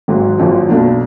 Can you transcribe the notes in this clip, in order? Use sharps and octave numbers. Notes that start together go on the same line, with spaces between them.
G#1 G#2 F#3
G#1 F#2 F3
B1 B2 F#3 D4 F#4